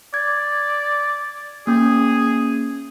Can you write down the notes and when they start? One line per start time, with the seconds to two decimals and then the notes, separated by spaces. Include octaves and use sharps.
0.14 D5 G#6
1.67 A#3 C#4 G#4